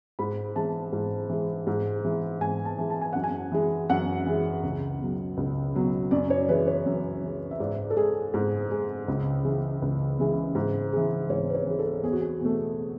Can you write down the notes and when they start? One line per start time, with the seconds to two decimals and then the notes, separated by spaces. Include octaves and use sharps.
0.19 G#2 B5
0.56 E3 G#3 A5
0.93 G#2
1.29 E3 G#3
1.67 G#2
2.05 E3 G#3
2.41 G#2 G#5
2.65 A5
2.78 E3 G#3
2.90 A5
3.01 G#5
3.13 F#2 F#5
3.24 G#5
3.52 E3 G#3
3.90 F#2 F#5
4.26 E3 G#3
4.63 C#2
5.00 B2 F#3
5.37 C#2
5.75 B2 F#3
6.11 F#2 D5
6.30 C#5
6.48 E3 G#3 B4
6.67 C#5
6.86 F#2
7.23 E3 G#3
7.51 E5
7.60 G#2 D5
7.90 A4
7.97 G#3 G#4
8.34 G#2
8.71 G#3
9.08 C#2
9.44 C#3 E3 G#3
9.82 C#2
10.19 C#3 E3 G#3
10.55 G#2
10.93 E3 G#3
11.29 G#2 C#5
11.50 B4
11.54 C#5
11.67 E3 G#3
11.79 A4
12.03 E2 G#4
12.12 F#4
12.21 G#4
12.41 B2 A3